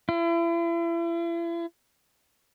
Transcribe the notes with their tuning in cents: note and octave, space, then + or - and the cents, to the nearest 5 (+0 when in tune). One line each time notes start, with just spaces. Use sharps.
E4 +40